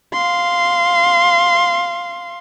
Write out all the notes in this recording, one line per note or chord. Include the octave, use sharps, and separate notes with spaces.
F5 C6